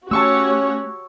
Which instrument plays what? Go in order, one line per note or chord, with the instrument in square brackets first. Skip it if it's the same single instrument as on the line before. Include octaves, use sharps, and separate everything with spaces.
[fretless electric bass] A3 [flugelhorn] C#4 [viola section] F#4 G4 C#5 [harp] A5 C#6 E6